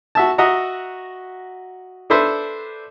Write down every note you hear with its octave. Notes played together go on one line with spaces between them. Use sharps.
F#4 E5 A5
F#4 D#5 E5 F#5 A#5
D4 A4 B4 C5 E5